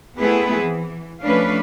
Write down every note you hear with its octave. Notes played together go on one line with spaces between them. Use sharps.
A3 B3 C4 E4 G#4 B4
E3
F3 A3 C#4 D4 B4 F5